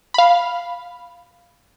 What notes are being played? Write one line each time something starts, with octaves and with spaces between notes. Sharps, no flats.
F5 B5